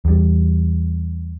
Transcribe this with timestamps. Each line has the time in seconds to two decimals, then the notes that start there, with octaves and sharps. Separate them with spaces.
0.05 E2 G3